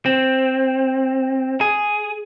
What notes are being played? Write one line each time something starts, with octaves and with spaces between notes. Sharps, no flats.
C4
G#4